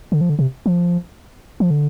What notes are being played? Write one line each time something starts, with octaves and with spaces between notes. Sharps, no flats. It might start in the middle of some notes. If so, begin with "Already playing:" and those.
D3
F3
D3
C3
F3
F3
D3